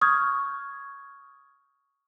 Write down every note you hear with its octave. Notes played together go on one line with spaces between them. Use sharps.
C#6 D#6 F6 G6 G#6